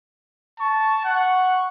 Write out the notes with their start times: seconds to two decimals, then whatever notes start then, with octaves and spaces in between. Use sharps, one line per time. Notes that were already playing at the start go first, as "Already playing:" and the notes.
0.60 A5 C#6
1.05 F#5